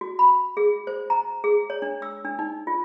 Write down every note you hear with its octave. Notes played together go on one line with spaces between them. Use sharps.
F#4
B5
G#4
C5
A#5
G#4
C#5
D4
E6
D4
D#4
F4